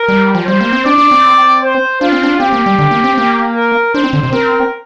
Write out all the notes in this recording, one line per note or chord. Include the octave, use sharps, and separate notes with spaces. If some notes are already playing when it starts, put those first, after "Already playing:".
Already playing: A#4
G3
F3
G3 C5
A#3
C4
D4 D5
D4
C4
C5
D4 F4
C4
D4
C4 G4
A#3
G3
D3
A#3
C4
A#3
A#4
D4 C5
C4
D3
C3
C4 A#4